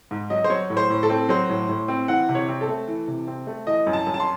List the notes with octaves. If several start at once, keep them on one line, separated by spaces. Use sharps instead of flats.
G#2
F#3 D#5
C5
F#3 C#5
A2
C5
A2
A4
C4
F#3 C5
A2
A2
C4
E3 F#5
C3
C#5
C4
A4
A3
E3
C3
C4
A3
E3 D#5
F#2
A5
F#2
A5
C6